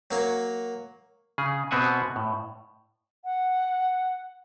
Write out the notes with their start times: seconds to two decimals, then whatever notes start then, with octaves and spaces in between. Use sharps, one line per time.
0.11 F#3 A#3 C#5
1.38 C#3 G#4
1.71 B2 B3 C4 E5 F#5 G#5
2.16 A2
3.24 F#5